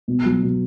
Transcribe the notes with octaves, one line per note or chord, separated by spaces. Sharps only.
B2
F#3
B2